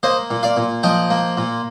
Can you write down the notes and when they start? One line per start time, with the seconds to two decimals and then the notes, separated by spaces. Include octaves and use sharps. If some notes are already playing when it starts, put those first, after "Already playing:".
0.03 A#3 C5 D#5
0.30 A#2
0.43 D5 F5
0.57 A#2
0.83 F3 D#5 G5
1.10 A#3
1.37 A#2